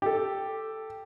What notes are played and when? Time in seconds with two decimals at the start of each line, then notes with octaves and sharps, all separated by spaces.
0.02 G4 A4